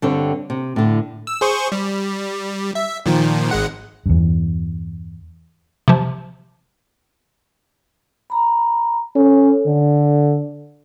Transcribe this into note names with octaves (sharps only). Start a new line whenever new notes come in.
G2 D3 C4 C#5
C3
A2 D3
E6
G#4 C5 C#6
G3
E5
A#2 D#3 F3
G#1 G#3 F#5
E2 G2
C3 F3
A#5 B5
C#4 A4
D3